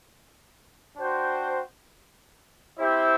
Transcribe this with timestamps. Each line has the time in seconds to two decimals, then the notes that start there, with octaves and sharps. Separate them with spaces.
0.97 D4 F#4 C5 G5
2.77 C4 E4 G4 C5 E5